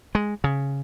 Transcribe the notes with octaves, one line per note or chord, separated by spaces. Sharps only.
G#3
C#3